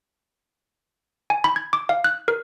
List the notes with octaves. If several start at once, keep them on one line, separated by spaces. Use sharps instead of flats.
G#5
B5
G#6
D6
F5
F#6
A#4